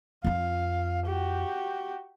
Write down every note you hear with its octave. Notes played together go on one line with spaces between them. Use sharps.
F2 F4 F5
F#4 G4